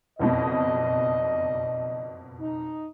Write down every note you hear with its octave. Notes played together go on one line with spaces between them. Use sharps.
F#1 F2 B2 D#4 D5 D#5
D#4